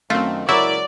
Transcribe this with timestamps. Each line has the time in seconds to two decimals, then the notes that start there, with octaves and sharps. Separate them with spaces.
0.10 F#2 D#3 A3 C4 F4
0.49 C#2 F#3 E4 A#4 D5 E5